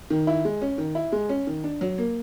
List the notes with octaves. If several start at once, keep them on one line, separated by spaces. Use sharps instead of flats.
D#3
E4
G#3
C#4
D#3
E4
G#3
C#4
D#3
D4
F#3
A#3